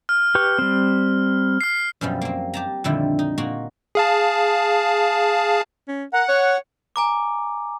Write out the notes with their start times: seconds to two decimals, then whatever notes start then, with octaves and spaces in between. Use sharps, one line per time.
0.09 F6
0.35 G4 B4 C#6
0.59 G3 C4
1.61 F6 C7
2.01 F#2 B2 F3 G3
2.22 A#3 C4
2.54 G4 A5 A#5
2.84 F2 A#2 D3 D#3 G3 E4
3.19 D#4
3.38 A#2 A#3 F#4 A#5
3.95 G#4 F5 A5
5.88 C#4
6.13 A#4 F#5
6.29 C#5
6.96 G#5 A#5 D6